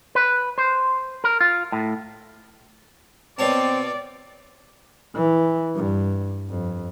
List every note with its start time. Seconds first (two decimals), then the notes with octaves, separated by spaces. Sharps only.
0.15 B4
0.58 C5
1.24 A#4
1.41 F4
1.72 A2
3.39 B2 C4 C#5 D5 A5
5.15 E3
5.75 G2
6.49 F2